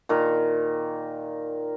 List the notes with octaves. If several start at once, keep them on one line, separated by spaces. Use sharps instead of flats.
A#2 D#3 A#4